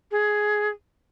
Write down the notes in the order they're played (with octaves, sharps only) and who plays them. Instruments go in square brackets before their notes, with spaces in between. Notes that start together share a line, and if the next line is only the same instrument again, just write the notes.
[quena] G#4